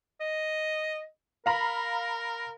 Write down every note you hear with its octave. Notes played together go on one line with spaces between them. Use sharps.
D#5
A#4 F5 A#5 B5